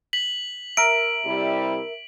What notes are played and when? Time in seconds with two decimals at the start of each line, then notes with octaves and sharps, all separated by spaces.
0.13 B6 F#7
0.77 A#4 E5 D7
1.25 C3 G3 E4